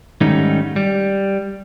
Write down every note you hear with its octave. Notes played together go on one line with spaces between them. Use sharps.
G#2 D#3 G3 A3 C#4 D#4
G3